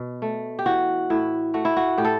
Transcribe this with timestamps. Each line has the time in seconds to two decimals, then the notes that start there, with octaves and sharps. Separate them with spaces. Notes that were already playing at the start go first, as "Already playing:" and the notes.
Already playing: B2
0.22 A3
0.59 G4
0.66 E3 F#4
1.10 A2 E4
1.54 A3 F#4
1.65 E4
1.77 F#4
1.98 A2 G4
2.05 A4